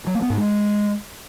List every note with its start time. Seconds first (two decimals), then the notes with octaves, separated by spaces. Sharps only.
0.07 F#3
0.14 A#3
0.22 B3
0.30 G#2
0.38 G#3